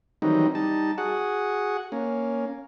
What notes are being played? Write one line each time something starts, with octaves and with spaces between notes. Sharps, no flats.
D#3 E3 F#3 G3 C4 D#4
G3 D#4 A5
F#4 G#4 F#5
A#3 C#4